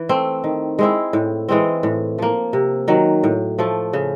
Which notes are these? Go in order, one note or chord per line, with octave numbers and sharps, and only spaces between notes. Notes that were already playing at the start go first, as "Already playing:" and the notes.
Already playing: E3
A3 C4
D#3
G#3 C4 E4
A2
E3 G#3 C4
A2
F3 A#3
C3
D#3 F#3
A2
F3 A3
C#3